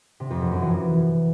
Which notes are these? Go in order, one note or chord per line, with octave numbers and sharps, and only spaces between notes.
C3
F2
F#2
F#2
E3